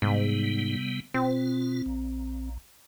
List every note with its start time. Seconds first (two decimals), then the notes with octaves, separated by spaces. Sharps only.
0.02 G#2 C3 G3 B3
1.14 B2 C4 F4
1.86 A#1